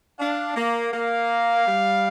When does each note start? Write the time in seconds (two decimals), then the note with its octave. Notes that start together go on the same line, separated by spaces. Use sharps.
0.19 D4 F5
0.56 A#3
0.93 A#3 F5
1.68 G3